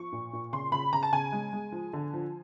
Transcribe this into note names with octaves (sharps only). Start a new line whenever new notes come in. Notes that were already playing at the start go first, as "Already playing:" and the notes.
Already playing: F3 C#6
A#2
A#2
C#3 C6
C#3 B5
C#3 A#5
A5
C#3 G#5
G#3
G#3
F3
D3
F3